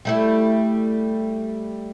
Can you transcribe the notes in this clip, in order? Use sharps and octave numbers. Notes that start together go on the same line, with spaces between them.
G3 A3 E4